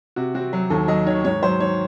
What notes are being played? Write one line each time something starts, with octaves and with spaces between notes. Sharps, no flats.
C3 F#4
C4 F#4
F#3
D#2 A4
F#3 D#5
D#3 C#5
G#2 C#5
F#3 C5
D#3 C#5